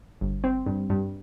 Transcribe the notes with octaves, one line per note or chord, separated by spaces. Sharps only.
G1
C4
G2
G2